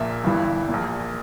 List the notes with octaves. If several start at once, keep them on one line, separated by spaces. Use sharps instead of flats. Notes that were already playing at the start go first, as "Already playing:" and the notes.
Already playing: A#1 A#2 E5
G1 G2 E3
A#1 A#2